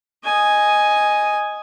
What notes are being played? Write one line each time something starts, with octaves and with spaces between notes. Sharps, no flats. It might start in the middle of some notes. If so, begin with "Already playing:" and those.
D#5 G#5